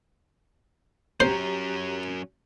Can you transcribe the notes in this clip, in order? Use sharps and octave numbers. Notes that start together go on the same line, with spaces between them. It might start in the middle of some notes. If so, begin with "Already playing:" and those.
F#3 C#4 G4 C5 A#5